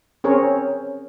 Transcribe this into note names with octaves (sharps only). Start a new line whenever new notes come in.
C4 C#4 G#4 A#4 C#5